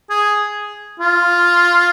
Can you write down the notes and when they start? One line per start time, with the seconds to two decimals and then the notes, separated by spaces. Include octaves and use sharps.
0.10 G#4
1.00 F4